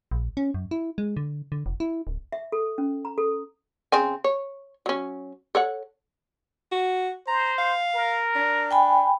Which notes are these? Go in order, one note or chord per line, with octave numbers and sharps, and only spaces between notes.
A#1
C#4
F#2
E4
G#3
D3
D3
F1
E4
D1
E5
A4
C#4
A#5
A4
C#3 C4 G#5
C#5
F#3 C#4
A4 C#5 F#5
F#4
C5 A#5
F5
A#4
D4
G5 G#5 B5